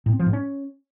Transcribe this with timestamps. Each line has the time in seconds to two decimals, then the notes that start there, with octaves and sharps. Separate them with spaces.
0.06 A2
0.13 C4
0.19 F3
0.26 G#2
0.33 C#4